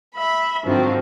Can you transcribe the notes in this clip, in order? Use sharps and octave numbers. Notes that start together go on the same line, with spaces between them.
E5 B5
G#2 D3 D#3 F3 F#3 C4